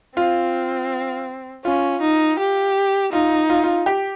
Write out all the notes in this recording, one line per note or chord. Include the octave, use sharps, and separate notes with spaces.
C4 F4
C#4 F4
D#4
G4
D#4 F4
F4
F4
G4